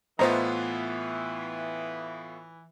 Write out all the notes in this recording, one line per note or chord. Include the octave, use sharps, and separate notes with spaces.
A2 E3 B3 F4 C5 D#5 A#5